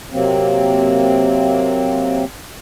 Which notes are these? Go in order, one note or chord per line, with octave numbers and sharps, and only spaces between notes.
C3 F#3 A#3 C4